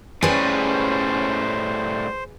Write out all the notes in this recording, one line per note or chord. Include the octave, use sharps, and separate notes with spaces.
A2 G3 C#4 G#4 B4 C5